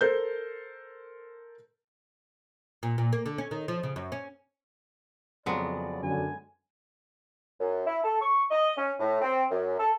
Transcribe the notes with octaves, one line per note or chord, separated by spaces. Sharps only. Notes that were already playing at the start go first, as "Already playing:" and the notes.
A4 A#4 C5 G6
A#2
A#2
A#3
D3
C#4
D#3
F3
C#3
F#2
C#4
F2 C#3 F#3 G#3 B3 D5
F#2 D3 G#5
F#2
E4
A4
C#6
D#5
C#4
A2
C4
F#2
A4